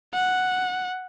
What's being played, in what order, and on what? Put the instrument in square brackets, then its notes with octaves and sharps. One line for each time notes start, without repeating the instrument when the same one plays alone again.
[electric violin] F#5